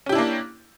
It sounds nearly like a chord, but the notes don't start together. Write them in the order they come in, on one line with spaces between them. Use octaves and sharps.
C#4 G4 E4 D4 A#3